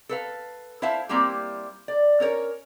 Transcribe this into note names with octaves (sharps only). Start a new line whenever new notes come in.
A4 B4 F5
E4 C5 E5 F5 A5
G3 A#3 C4 E4 G4
D5
C#4 A#4 C#5